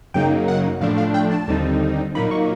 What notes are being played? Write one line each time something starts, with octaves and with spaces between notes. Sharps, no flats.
F#2 C#3 F#3 A#3 D#4 G5
F#5
A2 F3 A3 D4 F5
F5
G5
A5
D#2 D3 G3 C4 D#4
A#2 F#3 A#3 D#4 B5
C#6